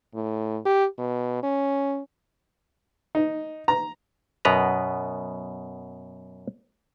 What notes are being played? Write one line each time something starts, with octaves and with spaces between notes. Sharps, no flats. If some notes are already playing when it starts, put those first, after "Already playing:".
A2
G4
B2
C#4
D#4
A#5
F#2 B2 B3 B4 A#5